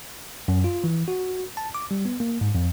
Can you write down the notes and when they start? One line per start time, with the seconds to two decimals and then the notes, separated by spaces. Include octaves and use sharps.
0.48 F#2
0.64 F4
0.84 E3
1.08 F#4
1.57 A5
1.75 D6
1.91 G3
2.05 B3
2.20 A#3
2.41 G#2
2.55 F2